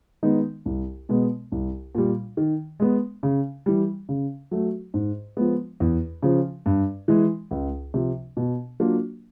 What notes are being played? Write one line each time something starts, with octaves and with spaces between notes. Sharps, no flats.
D#3 G#3 B3 D#4
C2
B2 G#3 B3
C2
A#2 G3
D#3
G#3 B3
C#3
E3 G3
C#3
F#3 A3
G#2
F3 G#3 B3
E2
C#3 F3
G2
E3 G#3
C#2
C3 F3
B2
F#3 A#3 D4 F4